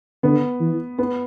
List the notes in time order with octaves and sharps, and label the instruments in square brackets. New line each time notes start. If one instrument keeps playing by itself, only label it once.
[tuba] D3 [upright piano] B3
[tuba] E3
[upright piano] B3